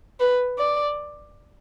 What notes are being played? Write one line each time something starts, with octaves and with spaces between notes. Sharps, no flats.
B4
D5